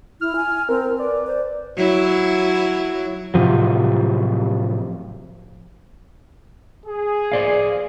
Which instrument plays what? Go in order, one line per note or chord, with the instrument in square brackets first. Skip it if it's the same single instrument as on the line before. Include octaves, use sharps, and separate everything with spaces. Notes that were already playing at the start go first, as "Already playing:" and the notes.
[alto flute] E4 [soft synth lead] F6
[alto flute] G#5
[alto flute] C4 [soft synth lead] A#4
[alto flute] B4 [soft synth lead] D5
[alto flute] C5
[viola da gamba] F#3 E4
[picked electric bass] A2 C3 F3 F#3
[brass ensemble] G#4
[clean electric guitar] C5 D5 F5